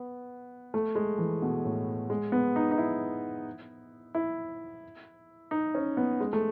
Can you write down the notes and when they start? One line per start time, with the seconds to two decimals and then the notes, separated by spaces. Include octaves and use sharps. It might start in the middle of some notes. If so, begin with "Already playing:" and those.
Already playing: B3
0.74 A3
0.95 G#3
1.18 E3
1.42 B2
1.65 A2
2.10 G#3
2.32 B3
2.56 D#4
2.71 D#4
2.78 E4
4.15 E4
5.51 D#4
5.75 C#4
5.97 B3
6.21 G#3
6.33 A3